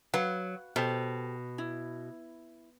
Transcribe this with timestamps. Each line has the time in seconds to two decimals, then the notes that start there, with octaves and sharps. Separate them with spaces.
0.14 F#3 B4 F5 F#5
0.76 B2 G4 A4 C5
1.58 E4